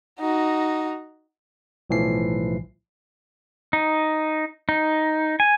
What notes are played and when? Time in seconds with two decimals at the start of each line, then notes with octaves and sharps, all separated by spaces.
0.20 D#4 F#4
1.90 B1 A2 E3 F3 C7
3.73 D#4
4.69 D#4
5.40 G#5